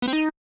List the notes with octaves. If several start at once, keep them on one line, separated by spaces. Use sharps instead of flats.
B3
C4
D#4